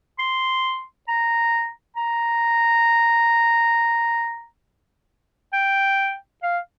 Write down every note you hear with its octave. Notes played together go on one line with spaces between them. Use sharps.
C6
A#5
A#5
G5
F5